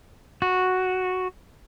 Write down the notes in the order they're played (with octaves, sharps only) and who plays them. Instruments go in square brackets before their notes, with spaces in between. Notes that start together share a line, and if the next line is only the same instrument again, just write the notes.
[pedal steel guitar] F#4